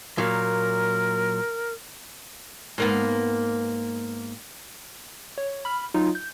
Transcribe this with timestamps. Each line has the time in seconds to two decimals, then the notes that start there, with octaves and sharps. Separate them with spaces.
0.18 A#2 F#3 A#4
2.78 G#2 A#3 B3
5.38 C#5
5.65 B5 F6
5.94 F#3 D#4 F4
6.15 G6